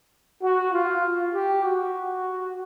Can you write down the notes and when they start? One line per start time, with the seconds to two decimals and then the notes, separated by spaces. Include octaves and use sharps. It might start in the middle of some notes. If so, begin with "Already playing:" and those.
0.42 F#4
0.71 F4
1.33 G4
1.64 F#4